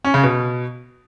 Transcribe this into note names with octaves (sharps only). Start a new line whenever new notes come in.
C#4
C#3
B2